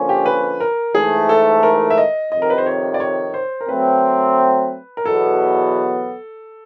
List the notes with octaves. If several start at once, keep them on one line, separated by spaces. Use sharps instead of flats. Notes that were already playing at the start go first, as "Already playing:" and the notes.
Already playing: D3 F3 A#3 C#4
G4
B4
A#4
G#2 E3 A3 G#4
A4
A#4
E5
D#5
F2 C3 D#3 D#5
A#4
B4
C5
C#5
D5
C#5
C5
A#4
F#3 A3 C4 B4
A#4
E2 B2 F#3 B3 A4